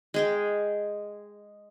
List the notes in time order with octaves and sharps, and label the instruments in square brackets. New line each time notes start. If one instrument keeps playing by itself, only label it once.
[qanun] G#3 G#4 G5